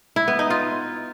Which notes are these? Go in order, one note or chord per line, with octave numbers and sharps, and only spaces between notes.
E4
B3
D#4
F4